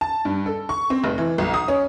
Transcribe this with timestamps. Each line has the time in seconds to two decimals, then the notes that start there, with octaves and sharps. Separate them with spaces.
0.01 A5
0.25 G2
0.46 A4
0.69 C#6
0.90 C4
1.04 F1
1.18 E3
1.38 B1
1.54 D#6
1.68 C#4